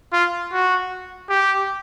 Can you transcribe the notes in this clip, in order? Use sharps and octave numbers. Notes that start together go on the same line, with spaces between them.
F4
F#4
G4